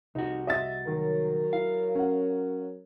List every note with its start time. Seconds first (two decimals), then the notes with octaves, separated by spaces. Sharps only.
0.15 C2 D#4 F#4
0.47 D#5 E5 A6
0.87 D#3 F#3 A#4
1.53 E4 F5
1.95 C#4 F#5